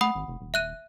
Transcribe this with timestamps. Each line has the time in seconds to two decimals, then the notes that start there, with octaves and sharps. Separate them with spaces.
0.01 A3 F#5 B5 D#6
0.15 G#1
0.28 F1
0.41 D#1
0.54 E5 F#6 D#7